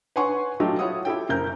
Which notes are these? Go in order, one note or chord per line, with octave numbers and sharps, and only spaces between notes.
B4 C#5 F#5 G#5 C6 C#6
F#3 A3 F4 G4 D#5
E4 F4 C#5 F#5 D#6
E4 G4 A4 G5
F#1 A#4 G6